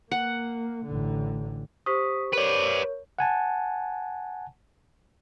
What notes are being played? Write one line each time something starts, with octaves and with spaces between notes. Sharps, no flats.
A#3 F#5
A1 D3
G4 C5 C#6 D#6 B6
A#4 B4 C#5 D5
F#5 G#5 A5